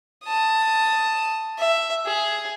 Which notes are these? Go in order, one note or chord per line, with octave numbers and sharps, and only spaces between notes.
A5 D#6
E5
G#4